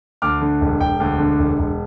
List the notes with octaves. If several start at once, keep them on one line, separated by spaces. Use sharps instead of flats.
D2 D6 F6
D3
E1
E1 G5
D2
D3
E1
E1